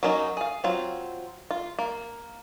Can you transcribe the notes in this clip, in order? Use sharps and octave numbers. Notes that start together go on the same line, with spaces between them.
F#3 A#3 C#4 D#4
G#4 F5
F#3 C4 F4
F4
A#3